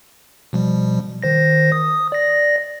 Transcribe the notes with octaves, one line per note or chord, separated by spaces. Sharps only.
B2 F3 G3
D#3 C5 A#6
D#6
D5 A#6